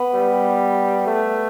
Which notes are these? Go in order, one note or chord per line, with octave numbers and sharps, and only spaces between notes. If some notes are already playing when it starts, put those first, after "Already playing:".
Already playing: B3
G3
A3